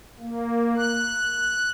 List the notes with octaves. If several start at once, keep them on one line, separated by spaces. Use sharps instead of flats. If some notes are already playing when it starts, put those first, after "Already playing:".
A#3
F#6